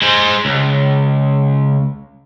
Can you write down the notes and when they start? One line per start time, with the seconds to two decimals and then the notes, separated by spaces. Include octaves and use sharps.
0.02 G#3 C5
0.45 C#2